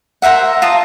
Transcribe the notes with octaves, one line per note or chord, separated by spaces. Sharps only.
A#4 C5 E5 F#5
F4 A5 A#5 D#6